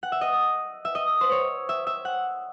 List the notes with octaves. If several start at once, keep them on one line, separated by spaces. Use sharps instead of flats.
F#5
E5
D#5
E5
D#5
C5
C#5
E5
E5
F#5